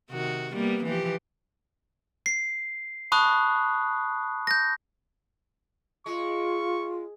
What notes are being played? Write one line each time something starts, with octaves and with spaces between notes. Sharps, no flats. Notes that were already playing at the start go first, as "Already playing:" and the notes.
C3 D#3 F#4
G3 A#3 B3
E3 F3 G4
C7
A5 B5 C#6 D#6 F#6
G6 A#6
G#3 F4 C#6